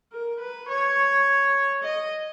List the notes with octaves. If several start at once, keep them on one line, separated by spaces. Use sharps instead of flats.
A#4
B4
C#5
D#5